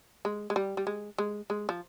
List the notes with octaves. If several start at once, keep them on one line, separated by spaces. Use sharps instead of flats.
G#3
G#3
G3
G3
G#3
G#3
G#3
F3